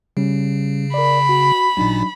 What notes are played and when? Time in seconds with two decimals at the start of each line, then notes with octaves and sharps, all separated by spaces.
0.17 C#3 G3 C#4
0.94 A#4 D5 B5
1.29 F#4
1.77 A1 A#2 F#3 D4 D#4